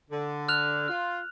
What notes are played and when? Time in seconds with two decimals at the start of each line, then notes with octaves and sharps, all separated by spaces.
0.11 D3
0.49 F6 F#6 F7
0.88 F4 F6